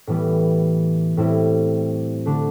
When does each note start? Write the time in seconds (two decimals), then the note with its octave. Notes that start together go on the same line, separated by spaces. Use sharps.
0.07 A2 E3 G3 B3
1.17 A2 G3 C4 E4
2.26 D3 A3 D4